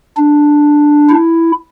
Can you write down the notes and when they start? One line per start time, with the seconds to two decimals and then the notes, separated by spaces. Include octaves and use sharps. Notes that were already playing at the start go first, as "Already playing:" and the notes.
0.17 D4
1.09 E4